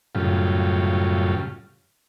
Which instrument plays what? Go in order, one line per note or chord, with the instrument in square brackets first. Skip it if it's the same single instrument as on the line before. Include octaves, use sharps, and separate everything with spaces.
[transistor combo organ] F#2 A2 C#3 G3 F4